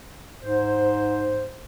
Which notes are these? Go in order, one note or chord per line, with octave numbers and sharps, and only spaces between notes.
G#2 C5